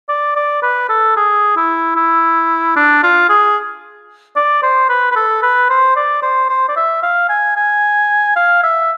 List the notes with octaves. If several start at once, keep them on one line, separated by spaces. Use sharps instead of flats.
D5
D5
B4
A4
G#4
E4
E4
D4
F4
G#4
D5
C5
B4
B4
A4
B4
C5
D5
C5
C5
D5
E5
F5
G#5
G#5
F5
E5